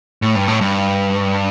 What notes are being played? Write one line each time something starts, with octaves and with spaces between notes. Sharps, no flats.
A2
G2
A2
G2